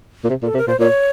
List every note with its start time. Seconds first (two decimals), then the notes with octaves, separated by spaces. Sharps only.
0.24 A#2
0.30 C3
0.43 A#2
0.45 A4
0.54 C3
0.58 A#4
0.67 A#2 C5
0.80 A#2 C#5